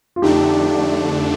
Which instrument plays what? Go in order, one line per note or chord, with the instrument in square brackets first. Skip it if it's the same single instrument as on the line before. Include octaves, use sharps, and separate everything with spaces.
[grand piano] F4
[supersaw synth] F2 D3 A3 D4 [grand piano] D#4 G4